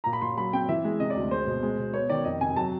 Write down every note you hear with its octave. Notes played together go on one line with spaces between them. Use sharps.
A#2 A#5
B5
A#2 C6
F#3 B5
C4 G5
E3 E5
G#3
C3 D#5
D5
D2
G#3 C5
B2
G#3
B2
B3 C#5
D#3 D5
F2 D#5
C3 G#5
F#3 A5